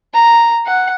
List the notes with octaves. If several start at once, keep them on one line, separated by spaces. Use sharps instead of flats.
A#5
F#5